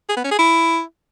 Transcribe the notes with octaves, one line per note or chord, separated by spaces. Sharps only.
G#4
B3
C#4
G#4
E4